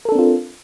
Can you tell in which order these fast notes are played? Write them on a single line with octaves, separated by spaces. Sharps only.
A#4 A4 D4 C4 F4